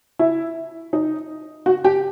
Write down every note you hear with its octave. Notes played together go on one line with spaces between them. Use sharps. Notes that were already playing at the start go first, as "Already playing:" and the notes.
E4
D#4
F#4
G4